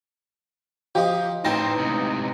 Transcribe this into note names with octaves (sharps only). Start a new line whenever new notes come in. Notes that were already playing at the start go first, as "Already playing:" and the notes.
F3 D#4 G4
A1 D#4 C5 C#5 G5 A5 A#6
C#2 C3